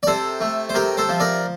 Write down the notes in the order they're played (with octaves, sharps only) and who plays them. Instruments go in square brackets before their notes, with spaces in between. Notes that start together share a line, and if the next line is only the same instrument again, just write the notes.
[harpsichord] D5
C3 A4 C5
A3
C5
C3 G4 A#4
A4 C5
F3
A#4 D5